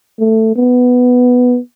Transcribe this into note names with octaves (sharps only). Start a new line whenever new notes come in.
A3
B3